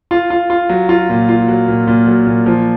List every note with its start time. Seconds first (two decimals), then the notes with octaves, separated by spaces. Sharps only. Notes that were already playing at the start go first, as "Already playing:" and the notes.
0.11 F4
0.30 F4
0.50 F4
0.69 F#3
0.89 F4
1.09 A#2
1.29 F4
1.48 F#3
1.68 A#2
1.87 A#2
2.07 F#3
2.26 A#2
2.46 F3